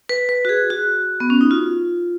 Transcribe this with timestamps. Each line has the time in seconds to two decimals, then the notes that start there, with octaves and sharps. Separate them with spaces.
0.09 B4
0.29 B4
0.45 F#4
0.49 G#4
0.70 F#4
1.20 B3
1.30 C#4
1.41 D#4
1.51 F4